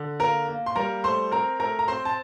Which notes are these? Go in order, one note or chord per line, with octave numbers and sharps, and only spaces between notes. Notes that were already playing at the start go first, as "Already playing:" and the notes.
Already playing: D3
A#3 A#4 A#5
A#3
C6
G3 A#4 A#5
A3 C5 C6
C4 A#4 A#5
A3 A#4 A#5
A#5
C4 C5 C6
A5